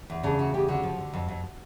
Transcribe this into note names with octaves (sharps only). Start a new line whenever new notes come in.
E2
C#3 D4
E2 F#4
C#3 G4
D3 F#4
F3
D3
F2
F2